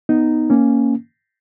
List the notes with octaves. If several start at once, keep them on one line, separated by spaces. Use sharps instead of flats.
B3 D#4
A#3 C#4